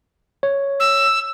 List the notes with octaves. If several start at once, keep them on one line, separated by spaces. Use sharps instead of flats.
C#5
E6